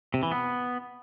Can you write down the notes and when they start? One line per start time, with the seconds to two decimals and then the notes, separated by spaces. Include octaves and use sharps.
0.14 C3
0.23 E3
0.32 B3